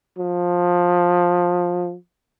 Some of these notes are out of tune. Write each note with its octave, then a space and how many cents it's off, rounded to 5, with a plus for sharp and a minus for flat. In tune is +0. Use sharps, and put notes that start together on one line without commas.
F3 +15